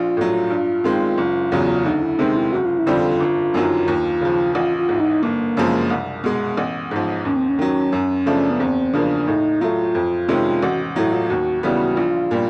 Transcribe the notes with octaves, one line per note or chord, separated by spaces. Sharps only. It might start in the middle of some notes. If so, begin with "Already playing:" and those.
Already playing: A#1 F4
A2 F#3
G2
D#3 G#3 C4
F#1
E2 C#3 F#3
D2 D#4
E4
C3 D#3 G#3 C4 D#4
E4
F#1 F#4
F4
E4
F2 D3 G3 C4
F4
G1
F#2 D#3 F#3
D#2
C#3 F3
A1 F4
F4
G#2 E3
D#4
G1 A#3
F#2 C#3 F3 G#3
C2
B2 G#3
A1
G#2 F3
D#2 C#4
C4
C#4
D#3 F#3
F#2
C#3 F3 A3 D4
B3
E2 C4
C#3 F3 A#3 D4
A2 D#4
F#3 A3 F4
F2
C3 D#3 G#3 C#4
A1 F#4
A2 F#3 E4
F4
D#2 F#4
C#3 E3 G3 B3 F#4
A#1 F4
A#2 G3